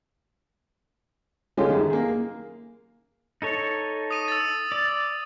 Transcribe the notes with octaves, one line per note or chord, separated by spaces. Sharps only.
C#3 G#3 C#4 F4 G4 A4
F#2 D#3
A#3 G#4
D#4 A4 C#5
D#6 D#7
E6 A6
D5